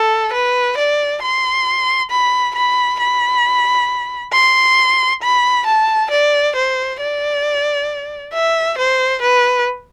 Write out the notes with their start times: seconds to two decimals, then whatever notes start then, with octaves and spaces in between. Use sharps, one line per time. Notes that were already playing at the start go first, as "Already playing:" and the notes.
Already playing: A4
0.33 B4
0.77 D5
1.22 C6
2.10 B5
2.55 B5
2.99 B5
4.33 C6
5.22 B5
5.66 A5
6.11 D5
6.55 C5
7.00 D5
8.33 E5
8.78 C5
9.22 B4